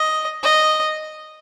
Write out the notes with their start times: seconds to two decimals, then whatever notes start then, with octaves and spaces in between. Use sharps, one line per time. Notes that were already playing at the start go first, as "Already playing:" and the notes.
Already playing: D#5
0.43 D#5